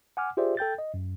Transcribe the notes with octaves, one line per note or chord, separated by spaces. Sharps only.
F#5 G#5 D6 F6
F4 G4 G#4 C5 D5 E5
A4 G5 G6 A6
D#5
F#2